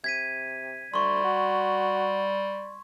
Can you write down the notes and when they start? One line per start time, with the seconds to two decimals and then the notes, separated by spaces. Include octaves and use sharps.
0.04 C3 G#6 B6 D#7
0.94 D2 G3 C6 C#6
1.24 F#4